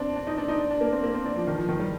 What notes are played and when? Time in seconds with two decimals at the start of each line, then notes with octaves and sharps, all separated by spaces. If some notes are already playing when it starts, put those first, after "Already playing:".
Already playing: C4 D4
0.16 D4
0.27 D#4
0.38 D4
0.48 D#4
0.60 D4
0.71 D4
0.81 A#3
0.92 C4
1.03 A#3
1.14 C4
1.25 D4
1.36 F3
1.47 D#3
1.57 F3
1.69 D#3
1.80 G3